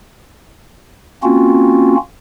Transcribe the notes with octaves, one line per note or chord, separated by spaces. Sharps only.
A#3 C4 C#4 F4 F#4